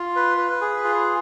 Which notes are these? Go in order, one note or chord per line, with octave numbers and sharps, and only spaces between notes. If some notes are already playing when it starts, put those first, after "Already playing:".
Already playing: F4
B4
B4
G#4
F4